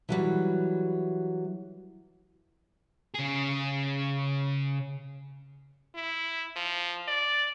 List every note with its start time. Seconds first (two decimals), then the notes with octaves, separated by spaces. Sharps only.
0.09 E3 F#3 G3
3.14 C#3 G#4
5.95 E4
6.57 F3
7.08 D5